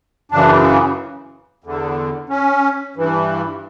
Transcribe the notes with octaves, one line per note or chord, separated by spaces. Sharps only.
F#2 C#3 E3 D4
E2 D3
C#4
G2 E3